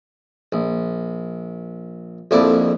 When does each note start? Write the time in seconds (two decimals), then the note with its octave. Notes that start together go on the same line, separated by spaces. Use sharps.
0.52 A#1
2.31 A#1 F2 D3 E4 D5